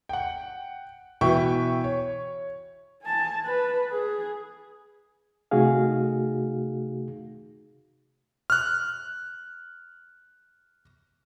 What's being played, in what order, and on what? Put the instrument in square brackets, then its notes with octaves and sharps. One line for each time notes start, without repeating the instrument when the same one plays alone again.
[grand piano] F#5 G5
B2 E3 B4 E5 G5 C#6
C#5
[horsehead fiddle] G#5 A5
B4
G#4
[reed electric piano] C3 A3 D#4 F#4 G#4 F5
[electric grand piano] F6 F#6